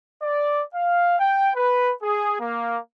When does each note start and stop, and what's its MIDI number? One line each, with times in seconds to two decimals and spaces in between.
0.23 0.62 74
0.74 1.17 77
1.19 1.50 79
1.56 1.93 71
2.03 2.37 68
2.40 2.78 58